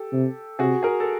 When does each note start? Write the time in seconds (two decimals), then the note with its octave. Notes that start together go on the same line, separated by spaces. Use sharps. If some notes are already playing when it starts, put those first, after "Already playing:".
Already playing: G4 A4
0.12 C3
0.59 C3 F#4 G#4
0.83 G#4 A#4
1.00 A4